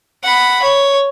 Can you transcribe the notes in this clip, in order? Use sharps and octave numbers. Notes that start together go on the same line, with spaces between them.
F#5 B5
C#5